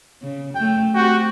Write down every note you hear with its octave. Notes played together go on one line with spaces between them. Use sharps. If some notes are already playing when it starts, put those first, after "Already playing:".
C#3
F#2 A3 G5
C4 F#4 G4 G5